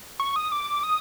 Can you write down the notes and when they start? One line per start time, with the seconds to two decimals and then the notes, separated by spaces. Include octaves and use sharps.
0.20 C#6
0.36 D#6
0.52 D6
0.83 D#6